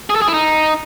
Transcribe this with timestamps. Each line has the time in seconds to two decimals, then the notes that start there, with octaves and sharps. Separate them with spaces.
0.10 G#4
0.16 A4
0.22 G#4
0.28 E4
0.34 D#4